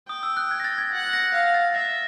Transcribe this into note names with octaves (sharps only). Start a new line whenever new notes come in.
G5 D#6
E6
F#6
G#6
A#6
A6
G#6
F#5
A#6
F5
A6
E5 A#6